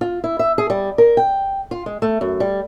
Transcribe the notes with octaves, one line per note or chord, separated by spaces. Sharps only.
F4
E4
E5
G#4
G3
A#4
G5
F4
G#3
A3
F#2
G3